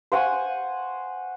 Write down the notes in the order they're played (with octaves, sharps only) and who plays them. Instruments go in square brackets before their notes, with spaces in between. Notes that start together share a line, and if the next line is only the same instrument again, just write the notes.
[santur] C5 F#5 G#5 C#6